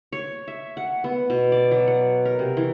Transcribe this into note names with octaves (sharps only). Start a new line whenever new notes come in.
C#5
E5
F#5
B3
B2
D5
F#3
F#5
A#4
C3
E3